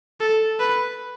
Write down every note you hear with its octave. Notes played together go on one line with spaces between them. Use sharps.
A4
B4